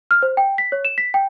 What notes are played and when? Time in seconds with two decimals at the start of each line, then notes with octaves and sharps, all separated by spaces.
0.11 F6
0.22 C5
0.37 G5
0.58 B6
0.72 C#5
0.85 E7
0.98 B6
1.14 G5